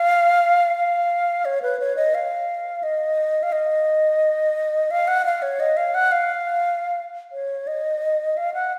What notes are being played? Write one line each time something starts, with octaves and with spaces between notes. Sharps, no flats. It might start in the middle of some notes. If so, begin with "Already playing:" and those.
Already playing: F5
F5
C#5
B4
C#5
D#5
F5
D#5
F5
D#5
F5
F#5
F5
C#5
D#5
F5
F#5
F5
C#5
D#5
F5
F#5